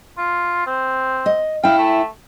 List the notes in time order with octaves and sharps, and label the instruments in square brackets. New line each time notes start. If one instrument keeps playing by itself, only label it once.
[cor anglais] F4
C4
[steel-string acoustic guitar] D#5
[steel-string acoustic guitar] E4 G5 [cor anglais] F5
[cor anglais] A3